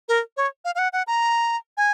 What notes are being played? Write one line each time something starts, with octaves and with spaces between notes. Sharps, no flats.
A#4
C#5
F5
F5
F#5
F#5
A#5
G#5